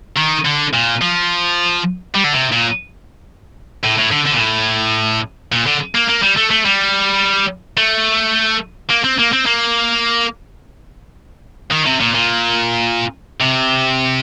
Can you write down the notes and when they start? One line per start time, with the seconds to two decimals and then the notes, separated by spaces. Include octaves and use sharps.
0.17 D#3
0.46 D3
0.74 A#2
1.02 F3
2.15 G3
2.24 D3
2.33 C3
2.52 A#2
3.84 A2
3.97 A2
4.11 D3
4.25 D3
4.33 A#2
4.39 A2
5.52 A#2
5.66 D3
5.95 A#3
6.08 A#3
6.22 G3
6.37 A3
6.50 A3
6.65 G3
7.77 A3
8.90 A#3
9.04 C4
9.19 A#3
9.33 C4
9.46 A#3
11.72 D#3
11.86 C3
12.00 A#2
12.14 A#2
13.41 C3